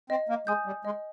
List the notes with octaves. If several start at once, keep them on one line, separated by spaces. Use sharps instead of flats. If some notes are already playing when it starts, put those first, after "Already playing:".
C4 D#5
A#3
G#3 G#5 D#6 G6
G3
G#3 D#5